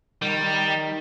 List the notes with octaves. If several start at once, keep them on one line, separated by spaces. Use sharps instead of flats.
D#3 G3